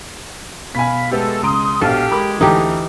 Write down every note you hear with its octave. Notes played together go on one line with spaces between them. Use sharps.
B2 F5 G#5 B5 B6
G#3 A3 B3 G4 A4
C#2 A#5 C6 D#6 D7
A#1 B2 B3 G4 A4 F5
G#3 A#4 B5 D6
D2 E3 D#4 G4 A4 A#5